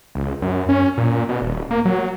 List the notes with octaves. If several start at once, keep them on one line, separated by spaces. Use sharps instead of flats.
C#2
F#2
C#4
A#2
B2
D#1
A#3
F#3